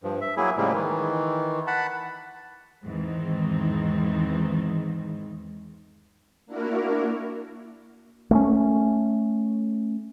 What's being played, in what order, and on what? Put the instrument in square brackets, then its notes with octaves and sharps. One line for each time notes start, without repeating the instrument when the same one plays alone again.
[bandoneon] G2 F3
E5
F#3 A#3 E4 G#4
A2 C#3 F3 G3 G#3 A#3
D#3 E3
F#5 A5 B5
[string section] E2 G#2 D#3 E3 C4
[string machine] A#3 D4 E4 F#4 A#4
[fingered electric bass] A3 A#3 C#4